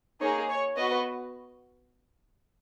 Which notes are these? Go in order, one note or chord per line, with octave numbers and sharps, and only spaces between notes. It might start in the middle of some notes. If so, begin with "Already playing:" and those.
A#3 D#4 G#4 C#5
C#5
B3 F#4 B4 D#5